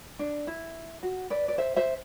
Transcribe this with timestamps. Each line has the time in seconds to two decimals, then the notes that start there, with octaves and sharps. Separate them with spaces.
0.19 D4
0.47 E4
1.03 F#4
1.30 B4 D5
1.48 D5
1.58 C5 E5
1.76 C5 E5